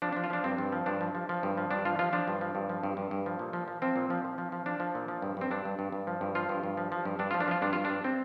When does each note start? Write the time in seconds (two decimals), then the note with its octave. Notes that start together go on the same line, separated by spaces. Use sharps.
0.02 F3 D4
0.12 F3 D4
0.24 F4
0.30 F3 D4
0.44 G2 C4
0.58 G2
0.72 F3
0.86 G2 D4
1.01 F3
1.15 F3
1.29 F3
1.43 G2
1.57 F3
1.71 G2 D4
1.85 F3 F4
1.99 F3 F4
2.13 F3 D4
2.28 G2
2.41 F3
2.55 G2
2.69 F3
2.83 G2
2.97 G2
3.11 G2
3.26 F3
3.39 A#2
3.53 F3
3.68 F3
3.82 F3 C4
3.96 A#2
4.10 F3
4.25 F3
4.38 F3
4.52 F3
4.66 F3 D4
4.80 F3
4.95 A#2
5.08 F3
5.22 G2
5.37 G2 C4
5.51 G2 D4
5.65 G2
5.79 G2
5.92 G2
6.07 F3
6.21 G2
6.35 F3 F4
6.49 G2
6.64 G2
6.77 F3
6.92 F3
7.05 G2
7.19 G2 D4
7.31 F3 F4
7.40 D4
7.48 F3 F4
7.62 G2 D4
7.73 G2 F4
7.85 D4
7.90 G2
8.04 C4